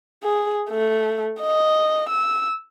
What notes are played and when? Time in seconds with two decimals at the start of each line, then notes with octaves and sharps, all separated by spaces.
0.24 G#4
0.70 A3
1.41 D#5
2.10 E6